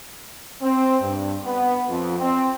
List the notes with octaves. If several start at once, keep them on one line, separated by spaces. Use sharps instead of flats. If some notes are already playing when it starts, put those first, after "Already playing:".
C4
G2
B3
F2
C4